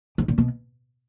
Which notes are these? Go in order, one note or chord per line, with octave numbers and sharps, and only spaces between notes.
G#2
A#2
B2